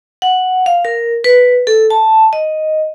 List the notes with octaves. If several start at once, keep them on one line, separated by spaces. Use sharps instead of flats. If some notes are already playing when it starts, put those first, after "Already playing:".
F#5
F5
A#4
B4
A4
A5
D#5